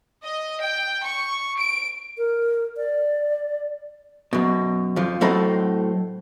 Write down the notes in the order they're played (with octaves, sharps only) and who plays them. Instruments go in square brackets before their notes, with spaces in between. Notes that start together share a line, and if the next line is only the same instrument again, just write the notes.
[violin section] D#5
G5
C#6
D7
[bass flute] A#4
D5
[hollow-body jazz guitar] F#2 B2
F2 F3
A2 F#3 C4 A4 D#5 B5